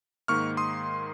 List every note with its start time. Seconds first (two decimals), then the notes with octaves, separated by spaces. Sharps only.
0.28 G#2 D#3 A#3 C#6 F6
0.57 C6 D#6